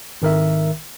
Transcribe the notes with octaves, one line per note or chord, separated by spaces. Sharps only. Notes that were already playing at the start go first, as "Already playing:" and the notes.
G#1 D#3 A#4 E5